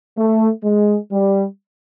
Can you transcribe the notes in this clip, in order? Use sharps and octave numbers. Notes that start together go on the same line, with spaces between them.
A3
G#3
G3